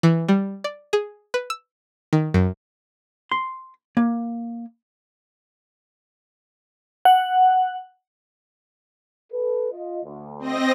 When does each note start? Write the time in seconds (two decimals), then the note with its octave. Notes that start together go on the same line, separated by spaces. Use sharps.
0.03 E3
0.29 G3
0.64 D5
0.93 G#4
1.34 B4
1.50 E6
2.13 D#3
2.34 F#2
3.32 C6
3.97 A#3
7.05 F#5
9.32 A4 B4
9.71 F4 D#5
10.04 D2
10.40 C4 D#5 A#6